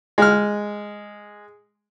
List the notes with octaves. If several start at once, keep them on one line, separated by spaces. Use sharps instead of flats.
G#3 F6